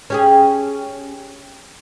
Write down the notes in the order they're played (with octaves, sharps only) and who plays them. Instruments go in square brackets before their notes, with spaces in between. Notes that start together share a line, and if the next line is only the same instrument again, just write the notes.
[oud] C#4 G4 G#4